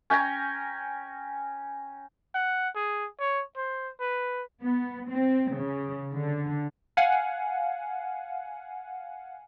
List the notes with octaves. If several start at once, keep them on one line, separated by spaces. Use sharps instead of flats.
C#4 G5 G#5 A#5
F#5
G#4
C#5
C5
B4
B3
C4
C#3
D3
F5 F#5 G#5